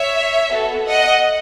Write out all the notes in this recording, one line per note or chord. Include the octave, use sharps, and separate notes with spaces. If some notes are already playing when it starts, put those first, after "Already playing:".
Already playing: C#5 E5
B3 F#4 A4
D#5 F#5